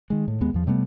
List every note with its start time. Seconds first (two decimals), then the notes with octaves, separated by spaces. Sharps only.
0.10 D#3 G#3
0.28 A2
0.41 D#2 G#3 B3
0.54 E2 F3
0.67 C3 G3 A3 B3